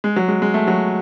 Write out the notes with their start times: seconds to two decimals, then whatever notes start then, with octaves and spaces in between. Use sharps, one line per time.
0.04 G#3
0.16 F#3
0.28 G#3
0.42 G#3
0.54 A3
0.67 F#3